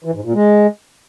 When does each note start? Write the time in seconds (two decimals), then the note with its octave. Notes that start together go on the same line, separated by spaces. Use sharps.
0.04 E3
0.14 G#2
0.24 A#2
0.34 G#3